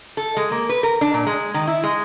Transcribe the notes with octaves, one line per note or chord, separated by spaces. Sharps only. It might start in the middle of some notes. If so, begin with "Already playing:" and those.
A4
G#3
A#3
B4
A#4
D4
A#2
G#3
D#3
E4
G#3